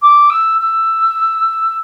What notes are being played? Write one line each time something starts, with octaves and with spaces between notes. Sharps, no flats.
D6
E6
E6